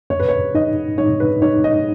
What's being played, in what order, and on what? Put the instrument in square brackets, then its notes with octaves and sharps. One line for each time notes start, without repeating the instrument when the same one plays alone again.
[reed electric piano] F2 [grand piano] C#5
[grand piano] B4
C#5
[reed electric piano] D#4 [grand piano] D#5
[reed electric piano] D#4 [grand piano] C#5
[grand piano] B4
[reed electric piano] D#4 [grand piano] C#5
[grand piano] D#5